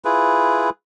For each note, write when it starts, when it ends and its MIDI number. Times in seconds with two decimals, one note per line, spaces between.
0.05 0.70 64
0.05 0.70 65
0.05 0.70 68
0.05 0.70 71